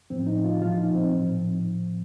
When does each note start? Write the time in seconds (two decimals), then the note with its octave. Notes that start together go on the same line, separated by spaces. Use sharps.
0.10 A2 F3 C4
0.27 D#4
0.45 F4
0.61 A#2 F3 F4
0.78 D#4
0.95 C4
1.13 A2 F3